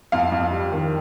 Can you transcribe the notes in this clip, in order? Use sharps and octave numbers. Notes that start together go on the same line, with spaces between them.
F2 F5
F2
G3
D#3